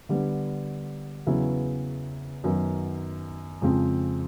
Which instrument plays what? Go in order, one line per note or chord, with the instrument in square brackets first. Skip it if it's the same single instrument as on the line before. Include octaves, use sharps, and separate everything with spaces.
[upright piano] D3 G3 B3
E2 C#3 F#3 B3 E4
F#2 D#3 F#3 B3 D#4
F2 C#3 F3 G#3 C4